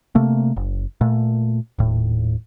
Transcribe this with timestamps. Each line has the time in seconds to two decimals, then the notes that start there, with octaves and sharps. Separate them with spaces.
0.15 C3 A3 A#3
0.56 F#1
1.01 A#2 A3
1.79 D#1 A2